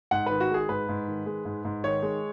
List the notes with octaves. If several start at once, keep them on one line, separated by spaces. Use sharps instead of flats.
G#2 F#5
D#3 B4
F#4
G#3 G#4
G#2 B4
G#2
D#3
G#3
G#2
G#2
D#3 C#5
G#3